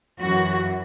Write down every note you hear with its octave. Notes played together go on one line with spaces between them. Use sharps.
F#2 E3 F#4